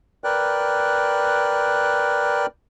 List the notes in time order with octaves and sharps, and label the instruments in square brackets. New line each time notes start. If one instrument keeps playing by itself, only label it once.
[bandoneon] A#4 B4 D5 G5 F#6